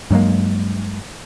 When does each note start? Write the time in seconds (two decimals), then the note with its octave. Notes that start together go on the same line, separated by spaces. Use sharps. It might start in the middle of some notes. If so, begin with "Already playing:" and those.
0.10 G2 F#3 G#3 A#3